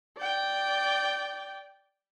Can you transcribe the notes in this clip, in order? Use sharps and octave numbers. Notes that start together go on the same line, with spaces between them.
D5 G5